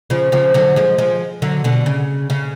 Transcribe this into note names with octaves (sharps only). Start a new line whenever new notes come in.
C#3 F3
C#3 F3
D3 F#3
F3 G#3
F3 G#3
D3 F#3
B2 D3
C#3
C#3